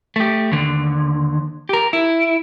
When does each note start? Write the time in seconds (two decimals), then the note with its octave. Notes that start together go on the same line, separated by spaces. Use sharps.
0.16 A3 G4
0.52 D#2 D3
1.69 G4 A#4
1.93 E4